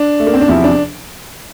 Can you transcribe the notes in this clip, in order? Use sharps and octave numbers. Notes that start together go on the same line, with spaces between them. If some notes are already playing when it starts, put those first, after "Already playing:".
Already playing: D4
A3
A#3
C4
D4
E2 C3 F3 E4
D4